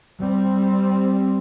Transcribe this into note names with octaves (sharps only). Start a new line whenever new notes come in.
G3 C4